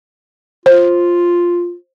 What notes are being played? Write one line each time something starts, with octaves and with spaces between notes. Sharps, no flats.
F4 C5